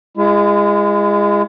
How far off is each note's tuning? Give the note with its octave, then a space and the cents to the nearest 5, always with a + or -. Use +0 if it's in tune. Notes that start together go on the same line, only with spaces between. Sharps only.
G#3 -20 E4 +45